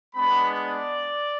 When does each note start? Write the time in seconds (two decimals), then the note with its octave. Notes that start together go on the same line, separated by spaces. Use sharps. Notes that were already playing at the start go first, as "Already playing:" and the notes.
0.14 G#3 B3 D4 B5
0.61 D5